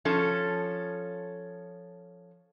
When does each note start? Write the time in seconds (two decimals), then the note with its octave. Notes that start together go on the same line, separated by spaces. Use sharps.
0.05 F3 C#4 A4